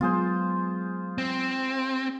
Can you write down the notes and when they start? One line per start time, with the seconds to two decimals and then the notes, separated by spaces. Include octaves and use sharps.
0.01 F#3 G#3 B3 F4 G#4 C5
1.18 C4